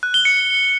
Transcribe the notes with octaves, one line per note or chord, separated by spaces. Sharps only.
F#6
G7
C#7